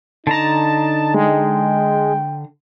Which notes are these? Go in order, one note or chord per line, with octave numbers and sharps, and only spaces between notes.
D3 D#4 A5 A#5
G#3 G5